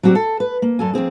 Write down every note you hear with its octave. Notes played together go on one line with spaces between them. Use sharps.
F#3 C4 F#4 G4 D5
A4
B4
A#3
F#2 A4 G#5
F2 G#2 C4 G#4